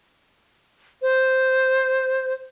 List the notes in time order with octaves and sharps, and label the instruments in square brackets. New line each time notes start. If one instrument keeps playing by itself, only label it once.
[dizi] C5